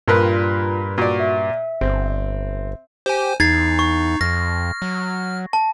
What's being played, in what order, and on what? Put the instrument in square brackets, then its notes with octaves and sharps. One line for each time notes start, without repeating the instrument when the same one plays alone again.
[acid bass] G2 [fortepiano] A#2 A#4 B4 [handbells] F4
[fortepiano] A#2 D5 [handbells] F#4
[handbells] E5
[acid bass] G1 [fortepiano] C4
[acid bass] G4 [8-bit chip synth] C5 G#5
[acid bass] E2 [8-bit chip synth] D#4 [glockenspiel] G#6 A6 C7
[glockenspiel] C#6
[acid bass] F2 [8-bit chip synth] F6 [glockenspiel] A#6
[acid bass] F#3
[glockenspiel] A5